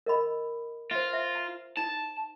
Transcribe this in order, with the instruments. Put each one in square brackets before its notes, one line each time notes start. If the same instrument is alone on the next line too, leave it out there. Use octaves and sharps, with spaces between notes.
[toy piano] A#4 D#5 B5
[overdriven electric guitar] F4 [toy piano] C5 E5
[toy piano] E5
A#5
[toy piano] D#4 [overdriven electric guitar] A5